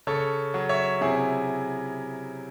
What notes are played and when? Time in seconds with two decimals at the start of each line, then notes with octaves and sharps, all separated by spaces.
0.07 C#3 A4 C#5
0.54 F#3
0.69 C#5 E5
1.01 C3 E4 G#4